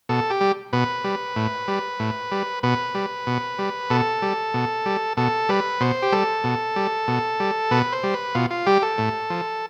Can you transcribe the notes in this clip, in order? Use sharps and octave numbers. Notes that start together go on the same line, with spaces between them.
B2 A4
G4
G3
B2 B4
G3
A2
G3
A2
G3
B2 B4
G3
B2
G3
B2 A4
G3
B2
G3
B2 A4
G3 B4
B2 C5
G4
G3 A4
B2
G3
B2
G3
B2 B4
C5
G3
B4
B2 F4
F4
G3 G4
A4
A2
F3